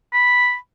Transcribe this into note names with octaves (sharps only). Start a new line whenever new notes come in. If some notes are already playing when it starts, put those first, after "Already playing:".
B5